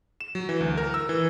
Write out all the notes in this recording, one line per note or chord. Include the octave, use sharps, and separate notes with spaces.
E7
F#3
E3
D2
A#4
E6
E3